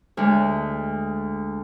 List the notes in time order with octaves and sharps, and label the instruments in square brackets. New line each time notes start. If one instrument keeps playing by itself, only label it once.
[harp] D2 G#3